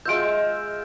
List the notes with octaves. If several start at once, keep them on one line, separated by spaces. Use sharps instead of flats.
G#3 F4 E5 G6 D7